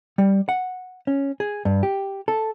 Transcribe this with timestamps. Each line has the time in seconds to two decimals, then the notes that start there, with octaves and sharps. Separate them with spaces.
0.18 G3
0.49 F#5
1.07 C#4
1.40 G#4
1.65 G2
1.83 G4
2.28 A4